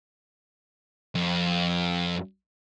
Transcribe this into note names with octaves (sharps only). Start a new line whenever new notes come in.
F2